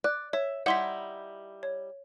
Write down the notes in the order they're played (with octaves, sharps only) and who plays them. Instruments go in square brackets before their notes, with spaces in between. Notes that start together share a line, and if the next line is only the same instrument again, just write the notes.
[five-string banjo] D5 [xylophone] F#6
[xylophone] C#5 [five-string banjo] E5
[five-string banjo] G3 D#4 E4 [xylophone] F#5 C6 B6
[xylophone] C#5